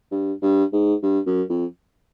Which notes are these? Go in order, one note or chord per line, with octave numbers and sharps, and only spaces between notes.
G2
G2
G#2
G2
F#2
F2